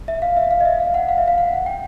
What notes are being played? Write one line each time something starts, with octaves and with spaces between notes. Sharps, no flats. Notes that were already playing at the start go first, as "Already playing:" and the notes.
E5
F5
E5
F5
D#5
E5
F5
F#5
F5
E5
F5
F#5
G5